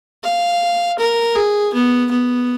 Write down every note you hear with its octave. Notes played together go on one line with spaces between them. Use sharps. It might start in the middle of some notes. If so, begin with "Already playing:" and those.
F5
A#4
G#4
B3
B3